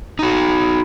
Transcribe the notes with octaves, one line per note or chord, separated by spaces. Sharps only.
D#4 F#4